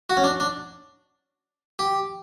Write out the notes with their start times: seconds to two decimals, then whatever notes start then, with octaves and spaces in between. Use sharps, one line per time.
0.10 F#4
0.17 C#4
0.24 D4
0.40 D4
1.79 G4